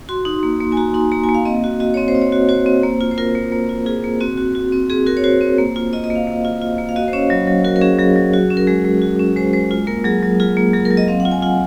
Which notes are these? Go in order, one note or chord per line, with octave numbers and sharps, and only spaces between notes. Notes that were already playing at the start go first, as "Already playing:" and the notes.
F#4 C6
D#4
A#3
A#3
G#5
F#4 A#5
D#4 C6
A#3 A#5
G#5
A#3
F5
C4 D#5
F#4
F#4 D#5
C4 C#5
C5
C4
C#5
F#4
F#4 C5
C4
A#3
F4
C5
F4 A#4
A#3
A#3
F4
F4 G#4
A#3
C4 F#4
F#4
F#4
C4
C4 G#4
F#4 A#4
C#5
F#4 C5
C4
A#3
F4
F4 D#5
D#5
A#3
F5
A#3
F4
F4
A#3
F5
F#4 D#5
C5
C#4 C#5
F#3
F#3
F#4 A#4
A#4
C#4 G#4
F#3 G#4
F#3
F#4
C#4
A#4
G#3 G#4
G#3
F#4
C#4
G#3 C5
G#3 C5
F4
A#3 A#4
F#3 G#4
F#3
F4 G#4
A#3
F#3 G#4
A#4
F#3
D#5
C4 F5
F#5
F4
G#5
F4 F#5